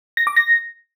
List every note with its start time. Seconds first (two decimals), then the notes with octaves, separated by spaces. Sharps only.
0.17 A#6
0.27 D6
0.36 A#6